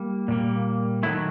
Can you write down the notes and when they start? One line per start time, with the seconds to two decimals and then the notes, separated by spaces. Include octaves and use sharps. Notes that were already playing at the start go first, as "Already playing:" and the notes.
Already playing: G3 A#3
0.28 A#2 G3 A#3
1.03 D#3 F#3 A3 E4